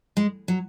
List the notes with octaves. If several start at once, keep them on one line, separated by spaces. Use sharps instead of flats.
G#3
F#3